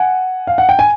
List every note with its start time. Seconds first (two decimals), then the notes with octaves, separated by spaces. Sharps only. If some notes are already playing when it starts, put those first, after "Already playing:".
Already playing: F#5 G#5
0.47 F5
0.58 F#5
0.69 G5
0.79 G#5